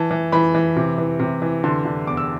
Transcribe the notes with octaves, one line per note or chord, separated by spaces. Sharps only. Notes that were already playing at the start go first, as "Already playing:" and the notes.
Already playing: E3 A5
E3
E3 B5
E3
C3
E3
C3
E3
D3 C6
D3
E2 D6
E6